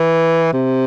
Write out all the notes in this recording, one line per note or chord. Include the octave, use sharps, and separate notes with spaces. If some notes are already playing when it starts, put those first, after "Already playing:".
Already playing: E3
C3